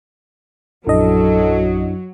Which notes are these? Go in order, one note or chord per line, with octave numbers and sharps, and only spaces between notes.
A#1 F#2 F#3 D4 E4 A4 D#5